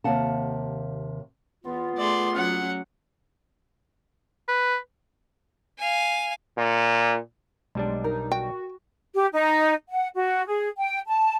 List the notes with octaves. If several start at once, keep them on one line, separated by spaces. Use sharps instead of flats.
D#2 C3 F5 F#5 A5
E2 B3 F4
A3 G#4 D5 C6
F#3 C#4 F#5
B4
F5 G#5
A#2
B1 G3 G#3 D4
D#4 A#4
F#4 G5
G4
D#4
F#5
F#4
G#4
G5
A5